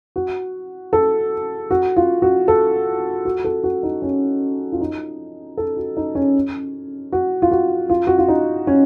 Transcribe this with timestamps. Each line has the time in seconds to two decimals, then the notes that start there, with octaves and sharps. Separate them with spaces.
0.16 F#4
0.93 A4
1.70 F#4
1.96 F4
2.22 F#4
2.48 A4
3.25 F#4
3.44 A4
3.64 F#4
3.83 D#4
4.02 C#4
4.72 F4
4.81 D#4
5.57 A4
5.77 F#4
5.97 D#4
6.15 C#4
7.12 F#4
7.42 F4
7.51 F#4
7.90 F4
8.07 F#4
8.18 F4
8.28 D#4
8.67 C#4